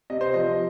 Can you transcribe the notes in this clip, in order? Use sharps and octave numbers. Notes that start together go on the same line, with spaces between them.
C3 D#5
C5
F3 D#5